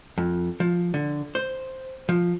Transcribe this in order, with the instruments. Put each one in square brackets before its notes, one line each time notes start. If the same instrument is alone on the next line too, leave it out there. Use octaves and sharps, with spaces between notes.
[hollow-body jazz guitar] F2
F3
D3
C5
F3